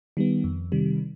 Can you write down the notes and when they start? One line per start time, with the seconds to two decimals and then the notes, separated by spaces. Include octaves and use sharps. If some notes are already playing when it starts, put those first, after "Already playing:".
0.17 D#3 G3 B3
0.44 F2
0.72 C3 D#3 G3